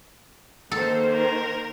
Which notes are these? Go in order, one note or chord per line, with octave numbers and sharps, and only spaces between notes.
D#3 A#3 A4 C5
A#4